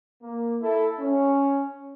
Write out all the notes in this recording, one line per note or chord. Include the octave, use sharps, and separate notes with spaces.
A#3
E4 A4
C#4